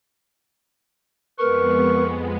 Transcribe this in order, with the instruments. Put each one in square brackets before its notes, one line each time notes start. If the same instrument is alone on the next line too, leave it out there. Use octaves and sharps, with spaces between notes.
[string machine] F2 G#3 B3 [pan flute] A#4 [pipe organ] B4 [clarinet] C#6